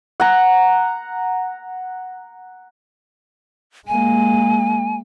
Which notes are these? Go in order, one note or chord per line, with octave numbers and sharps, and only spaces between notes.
F#5 A#5
G#3 A#3 G#5